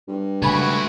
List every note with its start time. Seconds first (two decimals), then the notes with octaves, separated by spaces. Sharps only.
0.08 G2
0.42 C#3 G#3 A3 F#4 G#5 B5 G#6